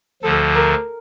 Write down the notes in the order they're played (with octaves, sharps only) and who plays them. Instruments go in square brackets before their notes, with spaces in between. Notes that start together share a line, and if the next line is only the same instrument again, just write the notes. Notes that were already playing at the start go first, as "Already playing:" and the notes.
[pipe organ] D2 D3 F3 [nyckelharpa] A4
[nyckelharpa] A#4